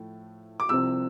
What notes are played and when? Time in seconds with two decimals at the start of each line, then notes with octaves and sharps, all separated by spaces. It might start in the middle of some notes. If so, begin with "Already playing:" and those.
Already playing: A2 F3 A3
0.60 D6
0.69 C2 C3 F3 C4 E6